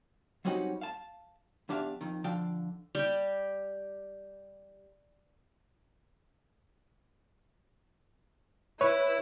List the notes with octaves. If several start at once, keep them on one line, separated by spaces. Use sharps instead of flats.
F#3 G3 C4 C#4 D#4 F#4
F5 A5
E2 D4 G4 E5 F5
F2 D#3
D3 F3 F5 G5
G3 G4
E4 B4 C#5